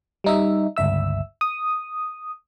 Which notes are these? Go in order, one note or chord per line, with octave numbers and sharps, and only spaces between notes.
G3 D#4 E5
G1 C#2 E5 E6
D#6